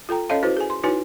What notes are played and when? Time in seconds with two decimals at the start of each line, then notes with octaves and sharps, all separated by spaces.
0.09 F4 A4 G5 A#5
0.29 C#4 A4 C#5 D#5 F5 A5
0.43 E4 F#4 B4 C5
0.57 G#4 G#5
0.70 C6
0.84 D#4 E4 F#4 B4 C#5 G#5